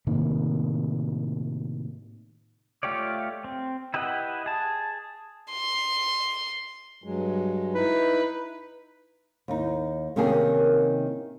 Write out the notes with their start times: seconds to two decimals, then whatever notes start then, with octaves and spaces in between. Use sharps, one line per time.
0.07 A2 C3 D#3 A#3
2.83 A3 F4 G4 C#5 D5
3.44 C4
3.94 E4 G4 B4 D#5 F#5
4.46 G#4 A5
5.52 C6
7.04 G2 F#3 G#3
7.74 D#4 E4 B4
9.48 D#2 D#4
10.16 C3 D#3 A#3 C#4 G4 G#4